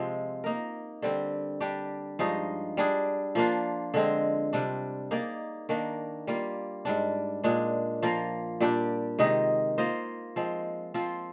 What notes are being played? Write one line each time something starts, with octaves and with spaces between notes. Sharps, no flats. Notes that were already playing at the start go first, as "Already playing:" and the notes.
Already playing: C3 F3 G#3 C4
A#3 D#4 A#4
D3 G3 C4
G3 D4 G4
G2 F3 G#3 D#4
G3 D4 G#4
F3 A#3 D4 F4
D3 G#3 C4
C3 G3 D4
A#3 D#4 G#4 D5
D#3 A#3 D4
G3 A#3 F4
G#2 G3 D4
A#2 G#3 D4
F3 A#3 F4 A#4
A#2 G3 D4 G4
C3 D#3 G#3 D#4
A#3 F4 C5 D#5
F3 G#3 C4
F3 C4 F4